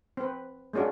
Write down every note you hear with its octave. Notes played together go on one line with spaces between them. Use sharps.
C4 B4
G#3 A#3 C#4 D4 F#4